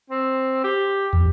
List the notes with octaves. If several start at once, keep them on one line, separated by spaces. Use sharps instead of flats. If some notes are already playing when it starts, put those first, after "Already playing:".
C4
G4
F2